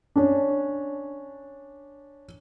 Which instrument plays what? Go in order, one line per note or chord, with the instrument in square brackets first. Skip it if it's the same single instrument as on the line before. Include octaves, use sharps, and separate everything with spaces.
[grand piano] C#4 D4